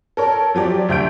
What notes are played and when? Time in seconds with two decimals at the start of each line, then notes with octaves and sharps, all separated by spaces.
0.17 A4 A#4 C#5
0.55 F3 F#3 G4 D5
0.89 D2 E5 G6 D7